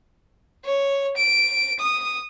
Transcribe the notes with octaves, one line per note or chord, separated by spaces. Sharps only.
C#5
D7
D#6